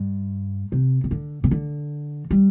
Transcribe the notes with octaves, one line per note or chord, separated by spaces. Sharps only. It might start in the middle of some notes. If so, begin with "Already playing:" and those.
Already playing: G2
C3
C3
D3
C3
D3
G3